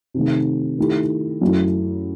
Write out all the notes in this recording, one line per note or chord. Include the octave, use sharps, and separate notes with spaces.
C3 D#3 A3
D#3 A3 E4 G4
F#2 F#3 A3 E4